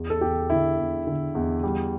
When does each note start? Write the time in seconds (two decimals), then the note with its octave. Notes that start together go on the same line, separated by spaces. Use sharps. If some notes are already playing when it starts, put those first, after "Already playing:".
Already playing: E2
0.10 A4
0.21 E2 G4
0.50 D3 E4
0.78 E2
1.07 D3
1.35 E2
1.63 G3